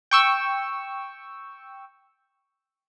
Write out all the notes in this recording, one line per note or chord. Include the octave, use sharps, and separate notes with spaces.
G5 C#6 E6